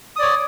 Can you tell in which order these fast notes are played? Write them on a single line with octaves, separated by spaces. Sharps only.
D#6 D5 C#5